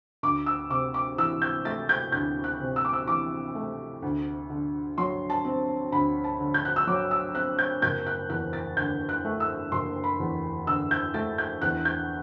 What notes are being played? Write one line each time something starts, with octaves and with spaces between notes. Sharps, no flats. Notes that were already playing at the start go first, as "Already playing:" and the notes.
D2 D6
E6
C3 D6
D6
E3 E6
G6
A3 A6
G6
D2 G6
F#6
C3
E6
D6
E6
E3 D6
A3
D2
D3
F#3 C6
A5
C4
D2 B5
A5
D3
G6
F#6
E6
F#3 D6
E6
C4 F#6
G6
F#1 G6
F#6
E2 F#6
A6
D3 G6
F#6
A3
E6
F#1 C6
B5
E2
D3 E6
G6
A3 A6
G6
E2 F#6
G6